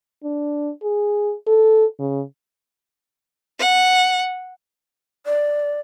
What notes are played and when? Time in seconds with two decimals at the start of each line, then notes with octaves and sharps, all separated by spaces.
0.24 D4
0.83 G#4
1.47 A4
1.99 C#3
3.60 F#5
5.25 D5